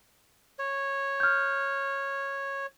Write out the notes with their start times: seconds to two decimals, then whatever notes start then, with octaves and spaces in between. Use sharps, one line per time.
0.59 C#5
1.20 F6 G6